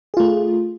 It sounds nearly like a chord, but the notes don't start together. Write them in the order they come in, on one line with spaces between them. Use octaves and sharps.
G#4 F4 A3